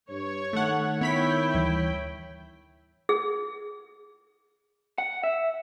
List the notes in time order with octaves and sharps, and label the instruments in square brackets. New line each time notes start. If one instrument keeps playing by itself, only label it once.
[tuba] G2 [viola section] C#5
[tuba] D#3 [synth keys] A3 F#5
[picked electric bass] B3 [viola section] E4 G5 [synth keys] C#5 B5 B6
[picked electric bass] D2 E3 G3
[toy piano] G#4
[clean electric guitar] F#5
E5